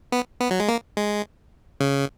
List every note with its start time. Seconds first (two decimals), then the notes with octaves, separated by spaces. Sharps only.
0.12 B3
0.40 B3
0.51 F#3
0.60 G#3
0.68 A#3
0.97 G#3
1.80 C#3